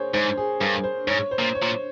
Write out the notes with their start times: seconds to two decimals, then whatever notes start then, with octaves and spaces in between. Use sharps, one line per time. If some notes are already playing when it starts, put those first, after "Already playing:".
Already playing: G#4 A#4 C5 C#5
0.14 G#2 C5
0.37 G#4
0.61 G2 A#4
0.84 C5
1.07 G#2 C#5
1.31 C5
1.39 A#2
1.55 C#5
1.62 A#2